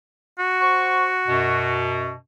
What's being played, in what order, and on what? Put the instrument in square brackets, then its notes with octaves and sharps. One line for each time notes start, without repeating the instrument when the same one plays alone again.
[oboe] F#4
[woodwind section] C5 F#5 C#6
F#2 B2